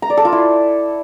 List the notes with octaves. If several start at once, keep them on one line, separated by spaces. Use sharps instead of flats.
A#5
D5
A4
F4
E4